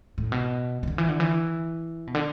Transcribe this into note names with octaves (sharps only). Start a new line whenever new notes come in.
A2
B2
B2
D3
E3
D3
E3
B2
D3